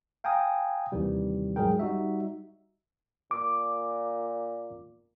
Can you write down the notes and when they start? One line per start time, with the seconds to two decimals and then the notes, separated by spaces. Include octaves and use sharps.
0.24 F5 G5 G#5 A#5 D#6
0.92 D#2 C3 D#3 E3 G3
1.56 G#2 F#3 G#3 G#4 A#4 G5
1.79 G3 D#4 F#4 E5
3.31 A#2 D6